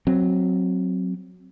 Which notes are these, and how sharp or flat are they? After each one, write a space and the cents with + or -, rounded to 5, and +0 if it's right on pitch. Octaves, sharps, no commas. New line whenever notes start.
F#3 +0 C4 +5